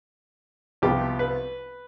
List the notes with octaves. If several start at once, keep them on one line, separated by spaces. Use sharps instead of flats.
C2 C3 F3 B3 F4 G4
B4